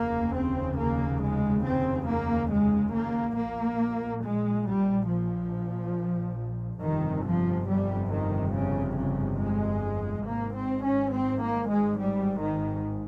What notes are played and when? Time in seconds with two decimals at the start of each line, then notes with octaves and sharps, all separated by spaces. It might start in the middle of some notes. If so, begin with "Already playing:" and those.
Already playing: F1 D#2 C#3 A#3
0.35 C4
0.78 A#3
1.21 G#3
1.65 C4
2.08 A#3
2.51 G#3
2.93 A#3
3.36 A#1 A#2 A#3
4.23 G#3
4.66 G3
5.09 F3
6.81 G1 F2 C3 D#3
7.25 F3
7.68 G3
8.11 D#3
8.53 C#3
8.97 C#3
9.40 G#3
10.26 G#1 G#2 A#3
10.55 C4
10.83 C#4
11.13 C4
11.41 A#3
11.70 G#3
11.98 G3
12.41 D#3